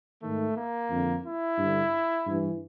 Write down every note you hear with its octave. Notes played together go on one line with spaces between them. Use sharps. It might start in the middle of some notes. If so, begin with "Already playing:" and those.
G#2 D#3 A3
A#3
F2 D3
E4
G2 D3
G2 E3